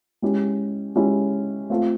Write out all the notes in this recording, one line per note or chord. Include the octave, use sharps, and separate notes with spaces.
G#3 C#4 E4 G4
G#3 C#4 E4 G4
A3 C4 F4 A4